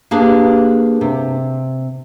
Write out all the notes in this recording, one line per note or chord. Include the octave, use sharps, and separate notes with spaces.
A#3 D4 G4 G#4 B4
C3